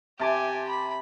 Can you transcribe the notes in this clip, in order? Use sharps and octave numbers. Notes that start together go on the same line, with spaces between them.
C3 G4 G#5 A5 D6
B5